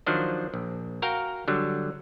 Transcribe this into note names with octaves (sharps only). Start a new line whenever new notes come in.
D#3 F3 F#3 D4 C5
A#1
F#4 A#4 F5 G5
D3 F#3 G3